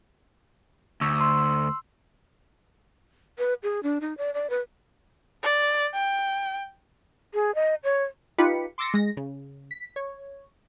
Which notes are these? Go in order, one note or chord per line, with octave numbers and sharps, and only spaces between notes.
D2 C#6 E6
C6 E6
B4
G#4
D4
D#4
D5
D5
B4
D5
G5
G#4
D#5
C#5
D#4 F4 G4 B4 B6 C#7
C6 D6 E6 A6 A#6 C#7
G#3 A#6
C#3
B6
C#5